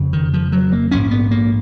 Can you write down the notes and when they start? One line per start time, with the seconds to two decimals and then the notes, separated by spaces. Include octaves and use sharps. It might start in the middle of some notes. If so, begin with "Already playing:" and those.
Already playing: F1 F2 C#3
0.13 D#3
0.34 F3
0.52 F#3
0.72 A#3
0.91 A#1 G#2 C#4
1.11 B3
1.31 A#3